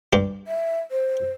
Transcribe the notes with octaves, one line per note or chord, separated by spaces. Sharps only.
G2 G4
E5
C5